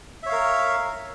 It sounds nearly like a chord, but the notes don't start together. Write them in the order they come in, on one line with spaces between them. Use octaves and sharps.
E5 C#5 F5 A#4